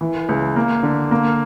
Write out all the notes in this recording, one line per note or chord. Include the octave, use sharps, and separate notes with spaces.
E3
C#2
A#3
D3
A#3